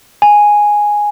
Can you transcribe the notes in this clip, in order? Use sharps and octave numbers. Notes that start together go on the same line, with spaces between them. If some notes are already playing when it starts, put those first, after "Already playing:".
G#5